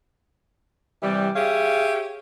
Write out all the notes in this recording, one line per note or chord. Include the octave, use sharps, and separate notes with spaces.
C3 E3 G3
G4 G#4 C#5 E5 F5